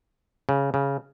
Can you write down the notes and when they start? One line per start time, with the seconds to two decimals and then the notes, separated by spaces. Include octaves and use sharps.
0.49 C#3
0.74 C#3